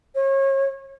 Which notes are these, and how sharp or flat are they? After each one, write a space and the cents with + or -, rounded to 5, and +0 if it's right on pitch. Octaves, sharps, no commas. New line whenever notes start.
C#5 -35